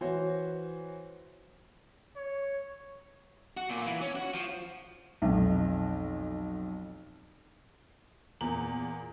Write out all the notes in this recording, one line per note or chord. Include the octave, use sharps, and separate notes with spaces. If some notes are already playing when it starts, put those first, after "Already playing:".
E3 F#4 C5 C#5
C#5
F#4
A#2
E3
C#4
F#4
F3
B1 F2
E2 A#2 A#5 F#7